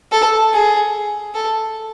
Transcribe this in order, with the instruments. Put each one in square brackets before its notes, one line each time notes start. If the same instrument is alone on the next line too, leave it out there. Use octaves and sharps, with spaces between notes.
[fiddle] A4
G#4
A4